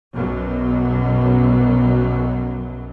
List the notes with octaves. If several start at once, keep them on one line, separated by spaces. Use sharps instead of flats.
B1 F#2 B2 F#3